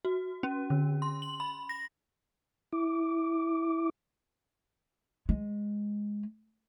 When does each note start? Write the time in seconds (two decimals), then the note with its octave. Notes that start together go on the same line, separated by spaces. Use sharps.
0.05 F#4
0.43 C#4
0.70 D3
1.02 C6
1.22 F#7
1.40 B5
1.69 A#6
2.73 E4 D6
5.29 G#3